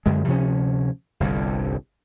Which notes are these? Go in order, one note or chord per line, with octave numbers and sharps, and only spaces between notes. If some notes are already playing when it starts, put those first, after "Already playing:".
F#2 D3 G#3
D2 C3 F3 C#4
G1 C2 G2 D3